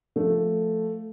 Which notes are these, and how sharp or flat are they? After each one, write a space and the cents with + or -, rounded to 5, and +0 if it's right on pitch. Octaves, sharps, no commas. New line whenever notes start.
F3 +0 A3 +0